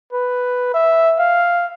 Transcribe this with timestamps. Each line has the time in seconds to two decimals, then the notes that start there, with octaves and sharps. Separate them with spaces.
0.13 B4
0.74 E5
1.19 F5